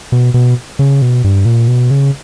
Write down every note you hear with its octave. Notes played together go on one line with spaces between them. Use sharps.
B2
B2
C#3
B2
G2
A#2
B2
C#3